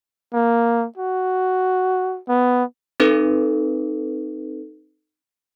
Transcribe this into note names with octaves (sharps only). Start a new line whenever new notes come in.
A#3
F#4
B3
C4 D#4 A4 B4